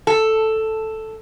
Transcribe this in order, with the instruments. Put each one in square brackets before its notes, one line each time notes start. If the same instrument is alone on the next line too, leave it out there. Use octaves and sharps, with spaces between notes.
[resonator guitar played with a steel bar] A4